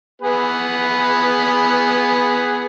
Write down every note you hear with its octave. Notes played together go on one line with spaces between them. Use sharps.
B3 G#4 B4